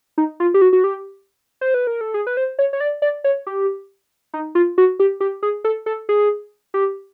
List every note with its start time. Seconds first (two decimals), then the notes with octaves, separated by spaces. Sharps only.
0.18 D#4
0.40 F4
0.54 G4
0.62 F#4
0.73 F#4
0.84 G4
1.61 C5
1.74 B4
1.87 A#4
2.01 A4
2.14 G#4
2.27 B4
2.37 C5
2.59 C#5
2.73 C#5
2.81 D5
3.02 D5
3.24 C#5
3.47 G4
4.34 D#4
4.55 F4
4.78 F#4
5.00 G4
5.20 G4
5.43 G#4
5.64 A4
5.86 A4
6.09 G#4
6.74 G4